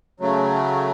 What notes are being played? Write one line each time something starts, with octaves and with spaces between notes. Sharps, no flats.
C#3 F#3 A3